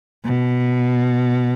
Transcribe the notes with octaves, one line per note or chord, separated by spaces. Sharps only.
B2